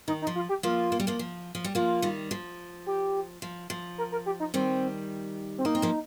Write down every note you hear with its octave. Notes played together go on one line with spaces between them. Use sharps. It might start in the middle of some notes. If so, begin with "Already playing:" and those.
D#3 D#4
D#4
F3
F4
G4
F3 A#3 F4
A#3
G3
F3 A#3
F3
F3
G3
F3 A#3 F4
D#3 G3
F3
G4
F3
F3
A#4
A#4
G4
D#4
D#3 G3 C4
C4
A#3 D#4
C4
F3 A#3